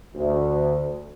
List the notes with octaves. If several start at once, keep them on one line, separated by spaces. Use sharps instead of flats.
D2